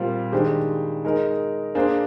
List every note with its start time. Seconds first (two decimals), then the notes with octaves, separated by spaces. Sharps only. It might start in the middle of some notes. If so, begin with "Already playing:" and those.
Already playing: A#2 G3 C4 F4 A#4
0.32 D#3 G#3 D4 G4 C5
1.05 G#3 D#4 A#4
1.75 A#3 D4 G#4 C5